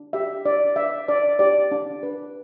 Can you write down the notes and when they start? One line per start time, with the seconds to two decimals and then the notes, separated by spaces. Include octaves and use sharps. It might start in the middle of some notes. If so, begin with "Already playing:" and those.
Already playing: D4
0.13 G4 E5
0.45 D4 D5
0.76 B4 E5
1.08 D4 D5
1.39 G4 D5
1.71 D4
2.03 B4